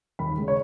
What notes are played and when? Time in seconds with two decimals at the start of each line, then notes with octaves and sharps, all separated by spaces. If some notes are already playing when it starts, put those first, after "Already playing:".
0.19 D#2 B5
0.37 C#3 G#3
0.48 C#5